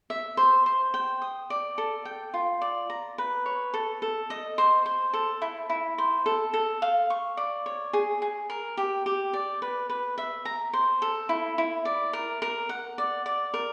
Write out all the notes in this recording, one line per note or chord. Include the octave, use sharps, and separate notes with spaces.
E5
C5
C5
G5
D#6
D5
A4
G5
F4
D5
A#5
B4
C#5
A4
A4
D#5
C5
C5
A4
E4
E4
C5
A4
A4
F5
C#6
D5
C#5
G#4
G#4
A#4
G4
G4
D5
B4
B4
E5
A#5
C5
A4
E4
E4
D5
A#4
A#4
F#5
D5
D5
A#4